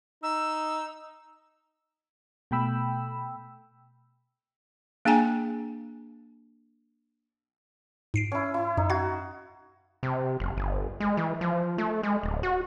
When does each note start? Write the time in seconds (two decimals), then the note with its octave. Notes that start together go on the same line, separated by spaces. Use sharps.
0.23 D#4 E6
2.51 B2 A3 G5 B5 E6
5.05 A#3 D4 G#4 G5 G#5 A#5
8.14 G#2 C7 D7
8.32 C#4 E4
8.54 E4
8.77 F#2 D#4
8.90 F#4 F5 G#6
10.03 C3
10.40 F#1
10.57 G1
11.00 G#3
11.17 E3
11.41 F3
11.78 A3
12.03 G#3
12.23 D1
12.43 F#4